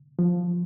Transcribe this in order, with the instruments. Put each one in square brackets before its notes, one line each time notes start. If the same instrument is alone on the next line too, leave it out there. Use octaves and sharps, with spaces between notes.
[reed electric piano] F3